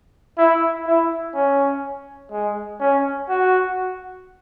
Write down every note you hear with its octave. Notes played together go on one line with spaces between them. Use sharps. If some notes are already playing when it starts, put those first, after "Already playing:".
E4
E4
C#4
G#3
C#4
F#4